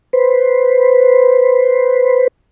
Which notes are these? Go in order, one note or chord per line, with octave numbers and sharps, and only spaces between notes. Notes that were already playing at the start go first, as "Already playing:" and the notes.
B4 C5